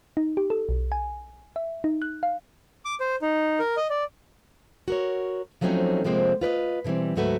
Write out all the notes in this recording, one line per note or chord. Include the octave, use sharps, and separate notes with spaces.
D#4
G4
A4
B1
G#5
E5
D#4
F#6
F5
D6
C5
D#4
A#4
D#5
D5
F#4 A#4 C#5
F3 F#3 A3 C4 C#4 D#4
C3 F3 G#3 A#3 C4
F4 B4 D5 D#5
B2 D3 E3 G3 C4
D2 G#2 F#3 A3 F#4 B4